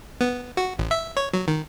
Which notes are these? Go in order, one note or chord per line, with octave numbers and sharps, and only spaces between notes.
B3
F#4
A1
E5
C#5
F#3
D#3